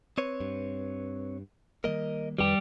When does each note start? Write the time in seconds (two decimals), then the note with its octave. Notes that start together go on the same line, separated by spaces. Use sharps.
0.18 C4 B4 C#5
0.40 G2
1.84 D#3 G3 A#3 A#4 D#5
2.38 F2 D#3 G3 G4 B4